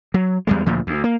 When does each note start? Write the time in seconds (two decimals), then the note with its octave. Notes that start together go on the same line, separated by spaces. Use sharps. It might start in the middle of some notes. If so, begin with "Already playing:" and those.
0.14 F#3
0.47 E2 G3 G#3
0.66 D2 A#2 F3
0.87 D2
1.04 A#3